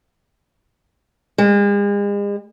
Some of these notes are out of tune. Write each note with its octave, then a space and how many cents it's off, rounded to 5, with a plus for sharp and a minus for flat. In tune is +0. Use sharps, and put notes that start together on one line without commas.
G#3 -45